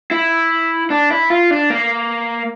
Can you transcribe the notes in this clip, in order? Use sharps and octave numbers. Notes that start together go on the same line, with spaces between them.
E4
D4
E4
F4
D4
A#3